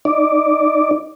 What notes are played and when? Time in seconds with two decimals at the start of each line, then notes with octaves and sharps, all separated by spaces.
0.05 D#4 D5